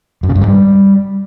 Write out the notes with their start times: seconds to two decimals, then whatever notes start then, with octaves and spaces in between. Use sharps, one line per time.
0.23 F#2
0.29 C#3
0.35 G2
0.41 G#2
0.48 G3